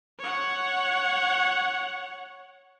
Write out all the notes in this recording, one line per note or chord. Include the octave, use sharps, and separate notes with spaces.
C#5 F#5